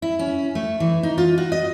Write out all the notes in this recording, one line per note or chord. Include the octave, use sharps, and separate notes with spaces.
E4
C#4
A3
E3
D#4
F4
F#4
D#5